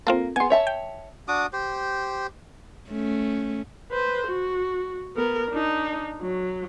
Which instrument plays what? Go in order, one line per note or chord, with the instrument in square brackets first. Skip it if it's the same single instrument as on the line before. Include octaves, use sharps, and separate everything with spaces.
[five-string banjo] A#3 [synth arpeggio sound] C4 F4 A4
[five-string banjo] B3 G#4 [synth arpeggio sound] G#5 C6
[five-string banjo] C#5 E5 A5
[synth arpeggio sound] G5
[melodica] D4 F#4 D6 D#6
G4 C5
[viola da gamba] A3 C#4
[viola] B4 C5
F#4
B3 A#4
D4 D#4
F#3